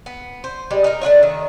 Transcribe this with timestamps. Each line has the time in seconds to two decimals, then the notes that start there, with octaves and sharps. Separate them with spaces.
0.06 B3
0.44 C5
0.71 G3 G#3
0.84 D#4 A#4
1.01 A3 D4 F4 C#5
1.23 D#3